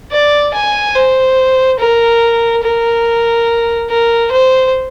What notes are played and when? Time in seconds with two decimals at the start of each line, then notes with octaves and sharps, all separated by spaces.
0.12 D5
0.54 G#5
0.95 C5
1.79 A#4
2.63 A#4
3.90 A#4
4.31 C5